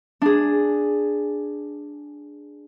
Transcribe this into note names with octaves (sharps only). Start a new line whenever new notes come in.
D4 G#4